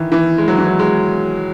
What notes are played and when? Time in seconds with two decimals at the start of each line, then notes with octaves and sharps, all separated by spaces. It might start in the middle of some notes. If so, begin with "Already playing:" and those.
Already playing: D#3 E3
0.12 E3
0.38 G#3
0.48 F#3
0.58 E3
0.67 F#3
0.79 G#3